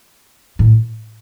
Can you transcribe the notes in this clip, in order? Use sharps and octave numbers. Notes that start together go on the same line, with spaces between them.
A2